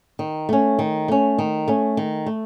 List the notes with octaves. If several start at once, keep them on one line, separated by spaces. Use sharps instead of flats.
D#3
A3 C#4
D#3
A3 C#4
D#3
A3 C#4
D#3
A3